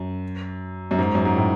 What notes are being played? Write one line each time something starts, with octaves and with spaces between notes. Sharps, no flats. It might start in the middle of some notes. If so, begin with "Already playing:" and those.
Already playing: F#2
F#2
G#2
F#2
G#2
A2